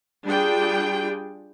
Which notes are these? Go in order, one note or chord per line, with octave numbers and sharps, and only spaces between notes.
G3 D4 F4 G#4 G5